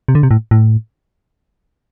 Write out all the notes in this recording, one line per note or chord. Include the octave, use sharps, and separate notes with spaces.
C3
D3
C3
A2
A2